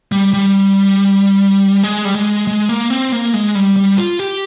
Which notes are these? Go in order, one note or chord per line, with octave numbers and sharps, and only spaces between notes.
G3
G3
G#3
G3
G#3
G#3
A#3
C4
A#3
G#3
G3
G3
F4
G4